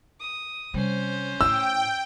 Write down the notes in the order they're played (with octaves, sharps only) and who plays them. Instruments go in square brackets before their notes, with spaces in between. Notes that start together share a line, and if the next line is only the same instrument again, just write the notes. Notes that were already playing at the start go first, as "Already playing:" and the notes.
[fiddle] D#6
[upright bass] C3 G3 [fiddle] C#4 C5
[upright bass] A2 E4 [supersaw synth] G5 [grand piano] E6